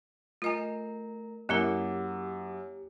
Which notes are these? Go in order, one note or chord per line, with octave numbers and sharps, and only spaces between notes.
A3 F4 A#4 D#5 G#5 A#5
F#2 A#3 E4 G4 A#4 F#5 A#5 D6